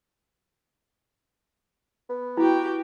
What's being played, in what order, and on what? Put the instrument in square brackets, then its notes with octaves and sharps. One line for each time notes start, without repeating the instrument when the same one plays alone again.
[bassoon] B3
[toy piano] E4 [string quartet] F#4 G4 G5